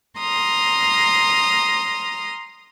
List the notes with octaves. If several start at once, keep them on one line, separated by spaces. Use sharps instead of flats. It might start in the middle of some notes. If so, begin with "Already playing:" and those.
A#5 C6 D#6 F6